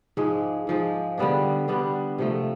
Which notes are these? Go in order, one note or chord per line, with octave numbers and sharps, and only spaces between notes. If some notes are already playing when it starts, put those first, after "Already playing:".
G#2 F3 G#3
G#2 F3 G#3
D3 G3 B3 D4
D3 G3 B3 D4
C3 F3 A3